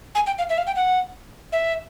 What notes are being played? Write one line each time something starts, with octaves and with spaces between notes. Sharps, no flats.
G#5
G5
F5
E5
F5
G5
F#5
E5